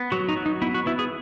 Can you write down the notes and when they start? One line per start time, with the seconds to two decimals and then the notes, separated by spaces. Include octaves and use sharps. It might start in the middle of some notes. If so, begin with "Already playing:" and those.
Already playing: B3
0.12 F#3 F#4
0.29 D#4
0.37 F#3
0.46 D#4
0.62 B3 E4
0.74 F#4
0.86 B3 E4
0.99 G#4